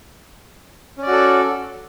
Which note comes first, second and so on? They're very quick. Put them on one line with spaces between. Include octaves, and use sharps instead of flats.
C#4 D5 F#4 A4